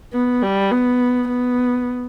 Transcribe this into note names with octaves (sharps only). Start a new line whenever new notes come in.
B3
G3
B3
B3